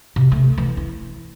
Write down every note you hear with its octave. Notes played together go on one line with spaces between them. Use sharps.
C3
A3
E3
E4